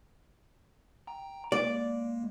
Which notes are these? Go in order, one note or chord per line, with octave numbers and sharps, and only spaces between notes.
G5 A#5
G#3 A#3 D5